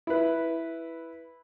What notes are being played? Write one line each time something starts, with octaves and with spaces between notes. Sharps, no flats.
E4 B4